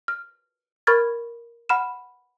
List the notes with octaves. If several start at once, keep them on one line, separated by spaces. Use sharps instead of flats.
F6
A#4 B5 C#6 F6 G#6 A6
F#5 B5 F6 E7